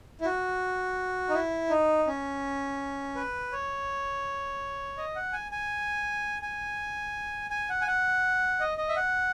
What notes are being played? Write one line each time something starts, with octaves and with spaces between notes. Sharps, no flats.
E4
F#4
D#4
E4
D#4
C#4
B4
C#5
D#5
F#5
G#5
G#5
G#5
G#5
F#5
G#5
F#5
D#5
D#5
E5
F#5